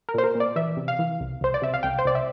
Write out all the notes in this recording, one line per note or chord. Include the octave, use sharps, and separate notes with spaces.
A#4
A#2 C5
A#4
A#2
D5
E3 E5
C3
F5
E3
C2
C2 C5
D5
C3 E5
F5
C2 G5
C5
C2 D5
E5